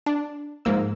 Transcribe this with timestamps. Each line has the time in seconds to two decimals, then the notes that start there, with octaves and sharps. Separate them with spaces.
0.06 D4
0.65 G#2 F3 A#3 E6